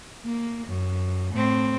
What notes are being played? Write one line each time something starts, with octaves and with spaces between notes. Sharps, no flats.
A#3
F#2
A2 C4